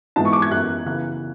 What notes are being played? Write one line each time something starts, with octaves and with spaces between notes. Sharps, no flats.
G#2 E3 G#3 B3 A5
C#6
D6
G#6
F#2 E3 B3 F#6
C#3 E3 B3 F#6